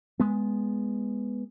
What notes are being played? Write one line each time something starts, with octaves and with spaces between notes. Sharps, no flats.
G#3 B3